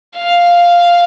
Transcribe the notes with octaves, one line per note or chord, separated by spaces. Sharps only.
F5